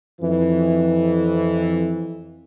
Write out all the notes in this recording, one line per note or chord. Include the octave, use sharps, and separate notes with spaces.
F2 E3